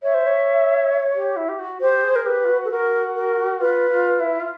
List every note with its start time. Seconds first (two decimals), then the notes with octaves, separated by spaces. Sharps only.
0.03 C#5 E5
0.14 C5
0.27 C#5
1.14 G4
1.36 E4
1.49 G4
1.59 F#4
1.81 G4 C5
2.03 G#4
2.16 A#4
2.26 G4 B4
2.45 F4
2.49 F#4
2.65 A4
2.70 F#4 A#4
3.15 A#4
3.60 F4 B4
3.91 F4
4.20 E4
4.40 F4